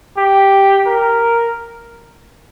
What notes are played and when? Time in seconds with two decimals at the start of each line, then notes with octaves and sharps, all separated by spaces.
0.18 G4
0.86 A#4